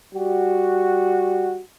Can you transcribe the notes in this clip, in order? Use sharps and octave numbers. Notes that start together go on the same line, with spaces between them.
G3 F#4